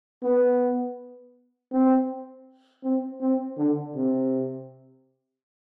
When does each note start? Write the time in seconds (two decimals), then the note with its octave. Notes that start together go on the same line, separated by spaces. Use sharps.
0.23 B3
1.71 C4
2.83 C4
3.21 C4
3.57 D3
3.95 C3